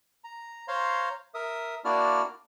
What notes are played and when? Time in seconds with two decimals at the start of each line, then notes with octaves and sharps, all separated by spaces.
0.24 A#5
0.68 C5 C#5 F5 A#5 C6
1.34 A#4 E5 D#6
1.85 A#3 D4 E4 F#4 D5 F6